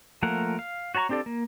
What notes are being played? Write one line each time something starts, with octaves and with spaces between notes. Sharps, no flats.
F3 A3 A#3 A#4 F#5
F5
F#4 C#5 A5 A#5 C#6
C4 D4 G4 A4 D5
A#3